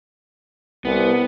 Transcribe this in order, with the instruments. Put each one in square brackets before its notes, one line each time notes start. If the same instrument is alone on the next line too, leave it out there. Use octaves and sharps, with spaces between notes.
[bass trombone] C2 [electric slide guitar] B3